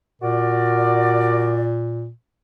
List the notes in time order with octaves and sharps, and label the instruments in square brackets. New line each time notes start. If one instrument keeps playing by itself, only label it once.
[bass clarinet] A#2 [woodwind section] F#4 A#4 D5